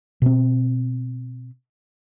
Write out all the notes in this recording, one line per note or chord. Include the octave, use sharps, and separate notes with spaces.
B2 C4